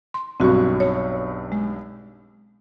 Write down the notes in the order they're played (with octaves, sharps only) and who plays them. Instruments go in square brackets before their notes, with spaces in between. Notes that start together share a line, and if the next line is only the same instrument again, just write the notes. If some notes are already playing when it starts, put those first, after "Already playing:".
[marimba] C6
[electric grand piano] B1 G2 C#6 [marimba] C4 F#4
[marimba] C#5
G#3